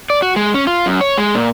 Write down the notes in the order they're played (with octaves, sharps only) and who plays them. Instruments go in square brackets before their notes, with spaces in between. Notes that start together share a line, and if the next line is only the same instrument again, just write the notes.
[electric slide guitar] D5
F#4
G#3
C#4
F4
F#2
C#5
G#3
A#2